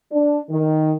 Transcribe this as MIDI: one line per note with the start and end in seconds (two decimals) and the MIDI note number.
0.12 0.39 62
0.50 0.93 51